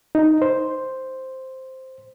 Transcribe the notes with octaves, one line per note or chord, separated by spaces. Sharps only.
D#4
C5